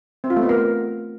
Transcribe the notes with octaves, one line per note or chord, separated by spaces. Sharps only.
C4
F4
A3
B3
A#4